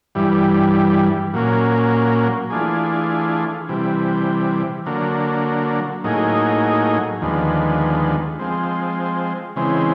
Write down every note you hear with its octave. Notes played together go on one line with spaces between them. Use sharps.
G2 E3 G3
A#2 F#3 A#3 C#4
E3 A3 D4 F4 G#4
C3 E3 G3
D3 F#3 A#3
A2 F#3 A#3 D#4 G#4
D#2 D3 F3 G#3 B3
F3 G#3 C4
C#3 E3 G#3 C4